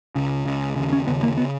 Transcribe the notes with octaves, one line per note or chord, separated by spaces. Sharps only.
C#2 C#3
C#2 C#3
D#2 C#3
C#4
D#2 C#3 B3
A#3
C#3 B3